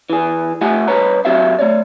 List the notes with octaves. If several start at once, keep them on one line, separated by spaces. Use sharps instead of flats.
E3 G#4
A3 F4 G4 E5 F#5 G#5
G2 B4 C#5 A#5
F#3 C4 F#4 G4 E5 F5
A3 C#5 D5